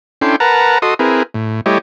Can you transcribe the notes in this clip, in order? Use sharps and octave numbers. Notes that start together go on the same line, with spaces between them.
C#4 D4 E4 A4 G5 C6
A#4 B4 F#5 A5 A#5
F#4 A4 D#5 C6 D#6
C4 E4 G#4 A#4 B4
A2
G3 A3 E4 G4 C#5 D#5